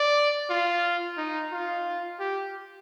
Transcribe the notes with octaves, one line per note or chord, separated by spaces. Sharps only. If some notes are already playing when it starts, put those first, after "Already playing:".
Already playing: D5
F4
D#4
F4
G4